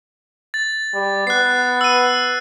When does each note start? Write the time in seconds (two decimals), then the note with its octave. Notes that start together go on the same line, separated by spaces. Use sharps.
0.54 A6
0.94 G3
1.27 B3 F#6 C7
1.81 E6 D#7